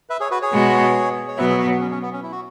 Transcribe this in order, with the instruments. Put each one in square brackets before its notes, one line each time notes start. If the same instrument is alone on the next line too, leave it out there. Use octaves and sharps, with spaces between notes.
[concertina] B4 E5
G#4 C#5
F#4 B4
G#4 C#5
[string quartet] B2 G#3 B3 F#4
[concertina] C#5
[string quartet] B2 F#3 B3 [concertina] B4 E5
[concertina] G#4 C#5
F#4 B4
B3
C#4
C#4
B3
C#4
E4
F#4